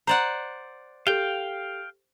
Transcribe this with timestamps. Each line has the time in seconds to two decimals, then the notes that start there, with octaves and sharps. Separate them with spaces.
0.07 C5 D5 F#5 A#5
1.07 G4 A4 F5 G5 G6 G7